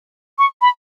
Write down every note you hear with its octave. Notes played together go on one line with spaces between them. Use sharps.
C#6
B5